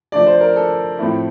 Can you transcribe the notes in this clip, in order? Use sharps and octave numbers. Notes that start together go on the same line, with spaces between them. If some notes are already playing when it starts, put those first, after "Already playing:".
F3 A3 D4 D5
C5
A#4
A4
A2 F3 A3 C4 E4